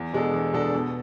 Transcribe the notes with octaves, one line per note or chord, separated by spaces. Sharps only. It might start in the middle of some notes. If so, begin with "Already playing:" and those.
Already playing: E2
B2 G#3 D4 A4
E2
B2 G#3 D4 A4
B2